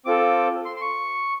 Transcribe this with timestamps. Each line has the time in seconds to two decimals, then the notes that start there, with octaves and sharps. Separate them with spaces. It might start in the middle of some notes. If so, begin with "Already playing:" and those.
0.05 C4 F4 A4 D6
0.65 C6
0.76 C6
0.81 C#6